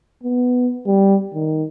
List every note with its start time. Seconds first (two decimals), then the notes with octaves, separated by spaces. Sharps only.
0.24 B3
0.87 G3
1.34 D#3